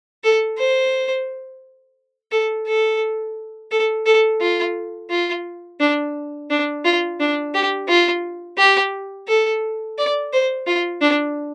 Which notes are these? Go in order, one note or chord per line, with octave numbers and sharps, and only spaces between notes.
A4
C5
A4
A4
A4
A4
F4
F4
D4
D4
F4
D4
G4
F4
G4
A4
D5
C5
F4
D4